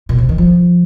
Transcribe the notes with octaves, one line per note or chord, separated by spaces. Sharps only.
A#2
C3
D#3
F3